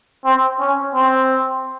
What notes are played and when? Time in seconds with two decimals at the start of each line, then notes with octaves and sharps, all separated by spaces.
0.25 C4
0.60 C#4
0.95 C4